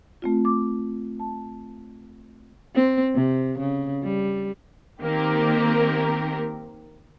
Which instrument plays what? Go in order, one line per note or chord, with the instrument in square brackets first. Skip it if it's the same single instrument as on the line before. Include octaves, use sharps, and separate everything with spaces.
[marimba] A3 C4 F4
D6
A5
[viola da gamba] C4
C3
C#3
G3
[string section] D#3 A#3 C4 G4 A#4